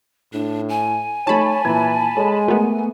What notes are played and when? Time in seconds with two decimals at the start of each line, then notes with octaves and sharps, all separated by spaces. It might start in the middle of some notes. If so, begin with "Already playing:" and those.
0.33 A2 D4
0.69 G#5
1.27 A3 D#4 C#5 A5 B5
1.65 A#2 E3 A#5 G#6
2.17 G#3 A4 C#5
2.48 A3 B3 A#4